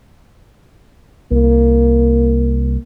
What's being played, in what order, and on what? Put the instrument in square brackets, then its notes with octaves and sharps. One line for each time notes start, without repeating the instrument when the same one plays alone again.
[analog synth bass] C2 [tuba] A#3